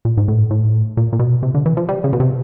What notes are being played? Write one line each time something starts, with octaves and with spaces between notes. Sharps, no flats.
A#2
G#2
A2
A2
A#2
A#2
B2
C3
D3
E3
F3
G3
C#3
B2
C3